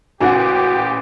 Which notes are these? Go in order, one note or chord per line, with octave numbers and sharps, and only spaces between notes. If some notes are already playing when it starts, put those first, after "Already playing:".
A1 A#2 C#3 F#4 G4 F#5 G#5